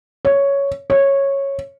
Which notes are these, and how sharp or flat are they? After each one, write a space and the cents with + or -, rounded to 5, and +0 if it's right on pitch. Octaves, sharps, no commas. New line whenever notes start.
C#5 +5
C#5 -10